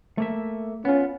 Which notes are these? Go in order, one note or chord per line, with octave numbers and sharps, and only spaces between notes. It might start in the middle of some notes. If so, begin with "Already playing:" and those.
A3 A#3 E5
B3 C#4 F4